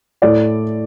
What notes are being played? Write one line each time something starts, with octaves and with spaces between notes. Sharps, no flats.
A2 A3 E4 D5